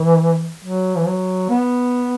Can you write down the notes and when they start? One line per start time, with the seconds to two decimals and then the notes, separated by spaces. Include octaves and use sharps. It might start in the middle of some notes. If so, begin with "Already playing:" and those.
Already playing: E3
0.64 F#3
0.97 E3
1.07 F#3
1.49 B3